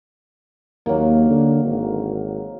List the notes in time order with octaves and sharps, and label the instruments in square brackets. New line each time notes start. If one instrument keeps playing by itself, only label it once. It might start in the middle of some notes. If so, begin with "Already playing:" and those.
[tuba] D#2 [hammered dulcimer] F#3 A#3
[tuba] D3
G#1